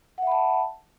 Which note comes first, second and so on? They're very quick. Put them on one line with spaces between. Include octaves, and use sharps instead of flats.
F#5 E5 B5 A5